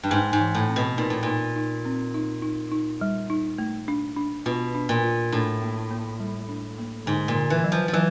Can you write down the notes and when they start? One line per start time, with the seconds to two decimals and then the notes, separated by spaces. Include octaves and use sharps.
0.03 G2
0.10 G#2 D#4
0.33 G#2
0.40 E3
0.55 A2
0.69 C4
0.76 B2
0.98 A#2 D#4
1.10 A2
1.23 A#2 D#4
1.56 D#4
1.85 C4
2.14 D#4
2.42 D#4
2.72 D#4
3.01 G3
3.30 D#4
3.58 A3
3.88 D4
4.17 D4
4.46 B2 F4
4.75 D4
4.89 A#2
5.04 F4
5.32 A2 D4
5.62 A#3
5.91 A#3
6.20 G3
6.49 D4
6.78 A#3
7.06 G#2 D3
7.28 A#2
7.35 D3
7.50 E3
7.64 F#3
7.72 F3
7.88 F3
7.93 E3 F#3